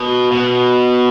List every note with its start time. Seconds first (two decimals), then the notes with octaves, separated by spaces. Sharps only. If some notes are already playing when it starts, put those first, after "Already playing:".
Already playing: B2
0.31 B2